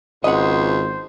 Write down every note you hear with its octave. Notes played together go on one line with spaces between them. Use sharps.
G#1 C#2 C5 D#5 F#5